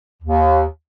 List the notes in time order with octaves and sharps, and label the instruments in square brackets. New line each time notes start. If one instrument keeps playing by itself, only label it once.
[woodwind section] D#2